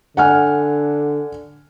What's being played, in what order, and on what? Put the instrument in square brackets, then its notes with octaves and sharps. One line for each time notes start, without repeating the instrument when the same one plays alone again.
[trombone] D3 [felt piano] F#5 G#5 F6